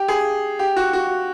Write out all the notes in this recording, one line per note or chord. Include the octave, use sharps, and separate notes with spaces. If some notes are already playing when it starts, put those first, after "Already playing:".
Already playing: G4
G#4
G4
F#4
F#4